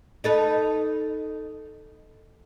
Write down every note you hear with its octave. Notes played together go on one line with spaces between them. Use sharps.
D#4 A4 B4